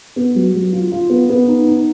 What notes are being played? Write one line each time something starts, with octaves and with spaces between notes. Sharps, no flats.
B3
F#3
F#3
F4
F4
B3
B3
D#4
D#4